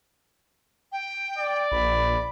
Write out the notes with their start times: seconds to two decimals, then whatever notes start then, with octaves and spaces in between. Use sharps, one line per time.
0.92 G5
1.38 D5
1.72 A#1 B5